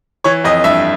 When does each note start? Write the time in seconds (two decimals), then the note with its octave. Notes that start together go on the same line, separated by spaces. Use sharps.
0.24 E3 C#5
0.44 F2 D#5
0.64 G2 E5